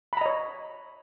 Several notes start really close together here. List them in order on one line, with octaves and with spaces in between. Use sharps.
B5 A#5 D#5 C#5